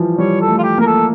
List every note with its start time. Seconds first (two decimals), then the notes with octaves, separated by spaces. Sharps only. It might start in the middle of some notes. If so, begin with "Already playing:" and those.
Already playing: E3 F3 G3
0.18 G3 C#5
0.41 A4
0.48 A3
0.58 F4
0.63 G4
0.78 A#3 A#4
0.86 A4